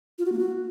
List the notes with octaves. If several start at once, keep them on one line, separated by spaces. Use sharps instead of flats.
F4
F#4
A#3
F#4